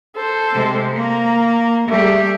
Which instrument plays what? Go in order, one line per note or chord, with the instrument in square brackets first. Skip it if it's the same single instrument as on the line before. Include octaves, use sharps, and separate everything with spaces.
[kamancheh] A4 C5
[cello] C3 G#3
[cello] A#3 [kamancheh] A#5
[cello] G3 G4 [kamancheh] A3 G#4